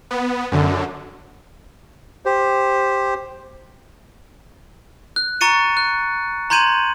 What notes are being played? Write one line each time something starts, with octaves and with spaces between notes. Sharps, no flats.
B3
F#2 D3
G4 C5
F#6
A#5 C#6 A6 C#7 D#7
F#6
A#5 C6 G6 G#6 D#7 F#7